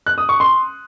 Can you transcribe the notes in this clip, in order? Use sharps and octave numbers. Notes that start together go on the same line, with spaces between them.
F#6
D#6
C#6
C6